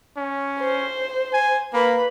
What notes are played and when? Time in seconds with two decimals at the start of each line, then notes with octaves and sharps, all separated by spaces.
0.17 C#4
0.59 C5
1.33 G#5
1.73 A#3 B4 B5